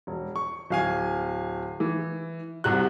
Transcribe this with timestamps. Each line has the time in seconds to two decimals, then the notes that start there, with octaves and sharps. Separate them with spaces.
0.07 E1
0.36 C#6
0.70 D1 F5 G#5
1.80 E3
2.64 C2 C3 F#4 F#6